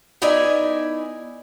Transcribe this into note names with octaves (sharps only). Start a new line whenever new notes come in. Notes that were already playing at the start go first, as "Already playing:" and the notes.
B3 D#4 E4 D5 E5 G#5